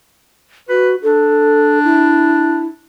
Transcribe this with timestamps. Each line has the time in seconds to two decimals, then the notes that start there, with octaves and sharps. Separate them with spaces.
0.69 F#4 B4
1.02 D4 A4
1.84 E4